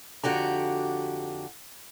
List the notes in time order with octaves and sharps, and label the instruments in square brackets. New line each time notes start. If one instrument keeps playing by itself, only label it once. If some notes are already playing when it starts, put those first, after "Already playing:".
[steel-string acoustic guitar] F2 D3 F#4 G4 A#5